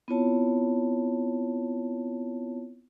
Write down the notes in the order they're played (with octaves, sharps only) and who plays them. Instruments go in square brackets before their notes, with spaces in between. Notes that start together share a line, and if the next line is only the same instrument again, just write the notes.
[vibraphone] B3 C4 E4 F4 C#5 A5